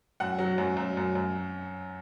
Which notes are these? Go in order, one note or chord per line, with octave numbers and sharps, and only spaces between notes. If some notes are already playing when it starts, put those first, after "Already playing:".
F#2 F#5
F#3
F#2
F#2
F#2
F#2